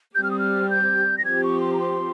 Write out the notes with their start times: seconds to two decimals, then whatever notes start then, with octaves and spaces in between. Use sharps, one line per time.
0.15 G3 C4 G4 G6
0.23 F6
0.31 D#6
0.39 F6
0.71 G6
1.18 A#6
1.25 F3 C4 G4 G#6
1.44 C#6
1.61 C6
1.73 A#5
1.80 C6